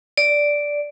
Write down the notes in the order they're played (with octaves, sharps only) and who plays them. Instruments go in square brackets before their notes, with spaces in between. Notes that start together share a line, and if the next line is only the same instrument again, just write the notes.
[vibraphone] D5